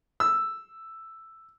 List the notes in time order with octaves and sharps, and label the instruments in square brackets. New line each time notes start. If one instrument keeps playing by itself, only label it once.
[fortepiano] E6